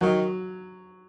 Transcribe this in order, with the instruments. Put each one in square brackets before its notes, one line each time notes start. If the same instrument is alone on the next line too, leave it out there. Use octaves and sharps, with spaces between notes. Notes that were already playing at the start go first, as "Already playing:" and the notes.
[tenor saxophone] D#3 [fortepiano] F#3